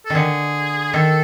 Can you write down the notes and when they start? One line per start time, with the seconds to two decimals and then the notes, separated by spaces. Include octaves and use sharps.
0.05 D#3 A4
0.15 D3 G#4
0.94 D#3 A4